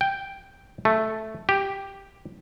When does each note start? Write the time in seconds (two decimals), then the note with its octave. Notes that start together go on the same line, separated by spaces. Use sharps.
0.01 G5
0.85 A3
1.49 G4